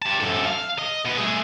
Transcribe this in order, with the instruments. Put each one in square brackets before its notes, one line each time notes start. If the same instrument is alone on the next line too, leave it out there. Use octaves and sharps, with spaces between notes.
[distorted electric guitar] G3 A5
F#2 A4
F5
D#5
B2 B4
A3 G#4